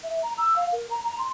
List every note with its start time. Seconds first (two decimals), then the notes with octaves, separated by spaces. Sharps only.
0.03 E5
0.23 A#5
0.38 E6
0.56 F5
0.73 A#4
0.90 A#5
1.06 A#5
1.18 C6